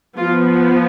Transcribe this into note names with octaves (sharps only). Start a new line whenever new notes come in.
F3 B3 F4